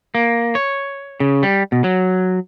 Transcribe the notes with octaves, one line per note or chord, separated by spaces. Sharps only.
A#3
C#5
C#3
G3
B2
F#3